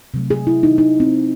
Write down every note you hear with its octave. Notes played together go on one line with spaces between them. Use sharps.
C3 F#3 A3
G#4
E4
D#4
D#4
C4